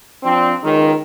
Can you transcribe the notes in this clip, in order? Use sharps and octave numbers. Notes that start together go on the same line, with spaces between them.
F3 C4 D4
C#2 D#3